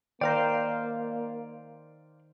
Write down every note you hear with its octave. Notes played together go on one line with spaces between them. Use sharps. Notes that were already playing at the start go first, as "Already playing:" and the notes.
D#3 A#3 C5 D5 F5 G5 A#5